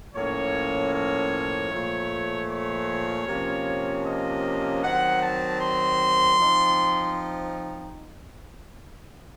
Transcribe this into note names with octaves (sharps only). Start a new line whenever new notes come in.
A2 F3 A#3 C#4 C#5
C#5
A#2 F3 A3
C#5
C3 F3 A#3 C#4
D#5
D#3 F#3 C4 F#5
A5
C6
F3 C4 D#4